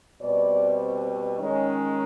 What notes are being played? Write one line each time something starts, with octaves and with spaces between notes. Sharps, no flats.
B2 G3 C4 D5
D#3 G#3 C#4